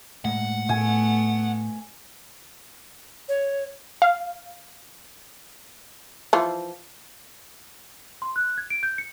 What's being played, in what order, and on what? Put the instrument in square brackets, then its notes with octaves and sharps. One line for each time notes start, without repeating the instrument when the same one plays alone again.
[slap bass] A2 G#3 A#3 [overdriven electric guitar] F#5
[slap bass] A2 [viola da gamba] A3 B3 [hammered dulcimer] G#5
[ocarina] C#5
[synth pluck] F5
[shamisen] E3 F3 F4
[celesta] C6
F#6
G#6
D7
G6
C#7